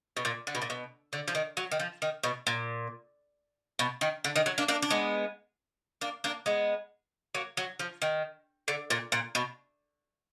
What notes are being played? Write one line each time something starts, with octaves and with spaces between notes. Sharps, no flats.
B2
A#2
D3
B2
A#2
B2
D3
F3
D#3
F#3
D#3
F3
D#3
B2
A#2
B2
D#3
D3
D#3
F#3
A#3 D4
A#3 D4
D4
G#3 B3
A#3 D4
A#3 D4
G#3 B3
F#3 A#3
F#3
F3
D#3
D3
A#2
A#2
B2